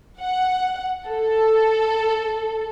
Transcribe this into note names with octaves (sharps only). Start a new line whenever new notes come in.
F#5
A4